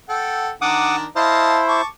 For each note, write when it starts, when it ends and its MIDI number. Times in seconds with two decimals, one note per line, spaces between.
0.09 0.50 69
0.09 0.50 78
0.09 0.50 79
0.61 1.05 51
0.61 1.05 62
0.61 0.96 78
0.61 1.05 82
0.61 0.96 86
0.61 0.96 87
1.16 1.82 64
1.16 1.82 72
1.16 1.60 75
1.16 1.60 77
1.16 1.60 81
1.68 1.86 81
1.68 1.86 85
1.68 1.86 86